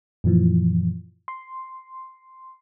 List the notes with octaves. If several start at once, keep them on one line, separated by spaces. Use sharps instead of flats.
F#2 A#2 E3 F3
C6